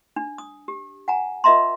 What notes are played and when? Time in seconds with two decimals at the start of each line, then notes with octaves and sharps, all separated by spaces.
0.16 D4
0.38 D#6
0.68 G4
1.08 F#5 G#5 A#5
1.44 F4 A#4 D#5 E5 A#5 C6